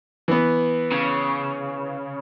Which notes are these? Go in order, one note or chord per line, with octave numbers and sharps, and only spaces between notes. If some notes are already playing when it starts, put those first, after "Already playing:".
E3 B3
C#3